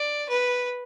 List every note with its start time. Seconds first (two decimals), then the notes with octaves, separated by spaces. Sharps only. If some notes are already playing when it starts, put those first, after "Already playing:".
Already playing: D5
0.29 B4